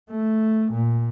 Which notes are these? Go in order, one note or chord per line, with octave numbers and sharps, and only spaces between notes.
A3
A#2